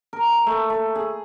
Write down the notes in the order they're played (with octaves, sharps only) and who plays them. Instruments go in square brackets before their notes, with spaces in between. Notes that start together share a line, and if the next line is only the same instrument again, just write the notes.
[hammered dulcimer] A#4
A3
A3
G#4